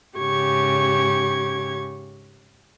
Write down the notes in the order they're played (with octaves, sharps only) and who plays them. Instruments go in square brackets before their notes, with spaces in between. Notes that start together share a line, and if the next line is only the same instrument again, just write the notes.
[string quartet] G#2 C#3 G4 C#6 G#6